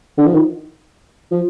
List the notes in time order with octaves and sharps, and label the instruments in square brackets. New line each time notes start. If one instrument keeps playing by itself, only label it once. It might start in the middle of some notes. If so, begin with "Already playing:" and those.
[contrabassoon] D3
F3
D#3
F3